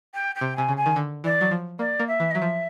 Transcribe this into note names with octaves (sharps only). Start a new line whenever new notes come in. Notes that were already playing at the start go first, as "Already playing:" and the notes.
G5
G5
C3
C3 G#5
C#3
G#5
D#3
D3
E3 D5
F#3
F3
A#3 D5
A#3
E5
E3
D#5
F#3 E5
F3